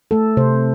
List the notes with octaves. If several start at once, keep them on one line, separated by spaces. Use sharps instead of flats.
A3 A4
C3 C5